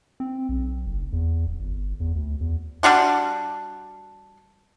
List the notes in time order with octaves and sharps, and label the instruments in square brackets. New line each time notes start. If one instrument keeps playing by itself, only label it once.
[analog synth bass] C4
B1
F#1
E2
D1
G1
E2
D2
E2
[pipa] G3 D4 F#4 C6